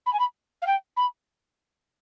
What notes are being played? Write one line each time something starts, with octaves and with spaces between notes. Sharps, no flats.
B5
G#5
B5
F5
G5
B5